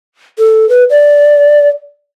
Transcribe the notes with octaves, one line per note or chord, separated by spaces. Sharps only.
A4
B4
D5